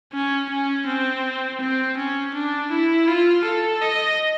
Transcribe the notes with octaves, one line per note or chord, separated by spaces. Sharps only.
C#4
C#4
C4
C4
C#4
D4
E4
F4
A4
D#5